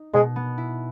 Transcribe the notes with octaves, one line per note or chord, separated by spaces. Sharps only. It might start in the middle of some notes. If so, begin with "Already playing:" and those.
Already playing: D#4
B2 G#3
B3
E4